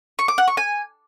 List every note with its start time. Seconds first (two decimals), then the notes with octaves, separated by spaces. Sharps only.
0.19 C#6
0.28 D6
0.38 F#5
0.48 C#6
0.57 G#5